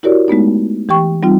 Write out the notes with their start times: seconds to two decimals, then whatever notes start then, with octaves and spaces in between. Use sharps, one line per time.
0.03 E4 F#4 G4 A#4 C#5 D5
0.28 G#3 A3 B3 D#4
0.89 E3 G4 G5 C#6
1.23 G3 C4 D#4 F4